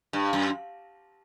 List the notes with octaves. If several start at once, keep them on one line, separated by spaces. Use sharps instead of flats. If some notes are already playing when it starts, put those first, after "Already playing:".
G2
F#2